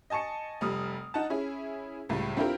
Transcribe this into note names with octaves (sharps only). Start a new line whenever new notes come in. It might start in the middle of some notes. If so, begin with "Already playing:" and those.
D#5 G#5 A5 C#6 C#7
F1 G3 D#6 F6
D#4 F#5 A5
C#4 E4 G#4
C#2 A2 G3
C4 D4 E4 F4 G4 A#4